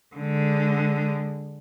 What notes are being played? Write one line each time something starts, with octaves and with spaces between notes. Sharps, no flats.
D3 G#3